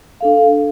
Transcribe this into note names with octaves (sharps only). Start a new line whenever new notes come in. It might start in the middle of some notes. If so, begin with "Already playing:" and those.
D4 A4 F5